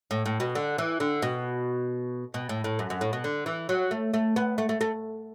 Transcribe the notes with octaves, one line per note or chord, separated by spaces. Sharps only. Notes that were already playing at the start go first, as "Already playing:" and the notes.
A2
A2
B2
D3
E3
D3
B2
B2
A2
A2
F#2
F#2
A2
B2
D3
E3
F#3
A3
A3
B3
A3
A3
A3